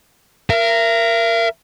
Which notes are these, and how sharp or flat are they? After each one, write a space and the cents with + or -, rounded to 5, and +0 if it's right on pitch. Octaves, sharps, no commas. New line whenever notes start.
A#4 +0 E5 +40